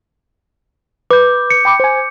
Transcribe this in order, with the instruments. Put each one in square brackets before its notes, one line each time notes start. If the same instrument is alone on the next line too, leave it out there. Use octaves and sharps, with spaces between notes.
[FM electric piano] B4 [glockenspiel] D6 G6
[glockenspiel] C#7
[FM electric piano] G5 B5 D6
C5 G#5